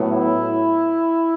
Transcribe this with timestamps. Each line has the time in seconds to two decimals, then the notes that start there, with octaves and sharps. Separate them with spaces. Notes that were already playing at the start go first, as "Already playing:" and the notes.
Already playing: A2 F#3 B3
0.11 E4